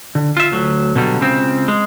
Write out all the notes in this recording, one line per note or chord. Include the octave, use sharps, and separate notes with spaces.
D3
F4 E5
D2 F#3
B2 D3 F#3 G3
C#2 C#3 C4
G#3